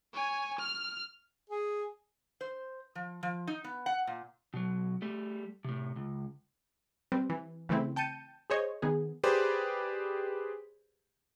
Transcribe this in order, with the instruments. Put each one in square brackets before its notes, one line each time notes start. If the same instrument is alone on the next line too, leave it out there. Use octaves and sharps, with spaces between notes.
[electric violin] C#5 G#5
F6
[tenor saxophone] G#4
[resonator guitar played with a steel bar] C5
F3
F3
D#4
B3
F#5
A#2
[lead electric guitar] B2 F#3
G3 A3
A2 C3
C#2
[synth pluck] G3 C4 B4
E3
C#3 E3 A3 C4 E4
G5 A5 G6 C#7 D#7
G#4 C5 C#5 D#5
D#3 B3 G#4
[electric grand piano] G4 G#4 B4 C5 D5